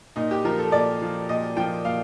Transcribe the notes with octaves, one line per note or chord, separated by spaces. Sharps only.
A#2 D#4
G4
F3 A#4
A4
A#2 D5
F3
A#2 D#5
F3 G5
A#2 F5